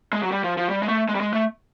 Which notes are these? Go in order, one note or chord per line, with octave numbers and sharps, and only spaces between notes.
G#3
F#3
G3
F3
F3
G3
G#3
A3
G#3
G3
G#3
A3